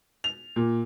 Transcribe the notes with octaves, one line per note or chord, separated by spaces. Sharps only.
F7
A#2